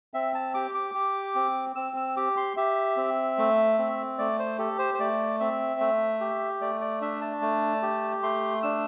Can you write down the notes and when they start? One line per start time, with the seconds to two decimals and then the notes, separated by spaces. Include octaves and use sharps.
0.14 C4 E5
0.34 A5
0.54 G4 D6
0.75 D6
0.95 G4
1.35 C4
1.75 C4 E6
1.97 E6
2.17 G4 D6
2.37 C6
2.57 G4 E5
2.97 C4
3.38 A3
3.78 C4
4.19 A3 D5
4.39 C5
4.58 G4 A4
4.79 C5
4.94 C5
4.99 A3 D5
5.40 C4 E5
5.80 A3
6.21 G4
6.61 A3 D5
6.81 D5
7.01 D4 E5
7.21 A5
7.42 A3
7.82 G4
8.22 A3 C6
8.63 D4 E6